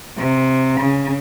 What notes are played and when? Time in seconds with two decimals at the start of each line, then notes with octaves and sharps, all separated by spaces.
0.18 C3
0.81 C#3